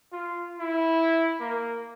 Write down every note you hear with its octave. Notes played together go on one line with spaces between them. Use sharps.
F4
E4
A#3